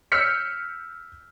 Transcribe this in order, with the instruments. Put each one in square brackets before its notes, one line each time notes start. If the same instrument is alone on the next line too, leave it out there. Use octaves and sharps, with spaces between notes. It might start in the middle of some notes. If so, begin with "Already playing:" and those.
[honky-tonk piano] E6 F6 G6 B6 C#7